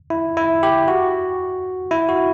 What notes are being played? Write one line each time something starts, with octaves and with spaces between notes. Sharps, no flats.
E4
E4
G4
F#4
E4
F#4